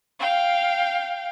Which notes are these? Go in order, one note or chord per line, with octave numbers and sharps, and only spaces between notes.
F5 G5